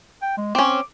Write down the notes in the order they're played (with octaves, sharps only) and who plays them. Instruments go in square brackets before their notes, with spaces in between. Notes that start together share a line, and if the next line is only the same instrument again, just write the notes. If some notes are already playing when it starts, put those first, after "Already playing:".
[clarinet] G5
G#3
[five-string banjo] C4 C#4 [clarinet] D6